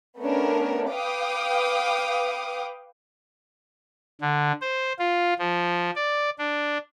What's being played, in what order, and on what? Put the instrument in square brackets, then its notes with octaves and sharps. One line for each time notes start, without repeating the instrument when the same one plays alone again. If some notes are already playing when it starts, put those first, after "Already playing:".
[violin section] A3 B3 C#4 D4 A#4
B4 F5 G5 D6 D#6
[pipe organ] D3
C5
F4
F3
D5
D4